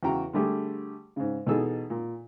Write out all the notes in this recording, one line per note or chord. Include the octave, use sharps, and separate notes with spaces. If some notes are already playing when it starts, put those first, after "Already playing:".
E2 C#3 F#4 G5 A#5
D3 G3 A3 G4 G#4
G#2 C#3
B2 E3 D#4 G#4 A4 E6
A#2